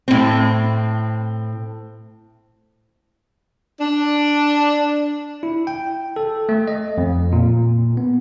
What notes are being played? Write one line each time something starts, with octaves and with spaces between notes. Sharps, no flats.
A2 C4
D4
E4
G5
A4
A3
D#5
F2
A#2
B3